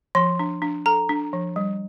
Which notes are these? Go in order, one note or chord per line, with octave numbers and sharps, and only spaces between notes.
F3 C6
D4
D4
A4 A#5
D4
F3
G3